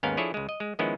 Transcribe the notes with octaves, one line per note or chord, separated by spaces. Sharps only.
D#2 G#2 B3 C#4 A#4 F5
F3 D4 E4 G#4 A4 C#5
C#2 G#3
D#5
G#3
D#3 F3 G#3 B3 C#4 E4